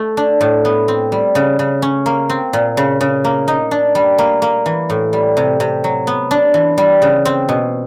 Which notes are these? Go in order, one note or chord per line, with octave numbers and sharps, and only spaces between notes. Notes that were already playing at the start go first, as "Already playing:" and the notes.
Already playing: A3
D4
A2
B3
C4
G3
C#3
C#3
C#4
A#3
C4
A#2
C#3
C#3
A#3
D#4
D4
G3
A#3
A#3
E3
A2
G3
C3
C3
F#3
B3
D4
E3
G3
C#3
C4
B2